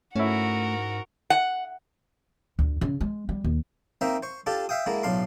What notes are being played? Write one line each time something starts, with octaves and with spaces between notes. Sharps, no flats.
G#2 A3 C#4 E4 F#4 A#4
F#5
D2
C#3
G#3
G3
D#2
A#3 C4 D#4 C5 E5
C5 C#6
D4 F4 G4 A4
E5 F5 G5 D#6
D3 G#3 A#3 E4
B1 A2 D4 F5 C6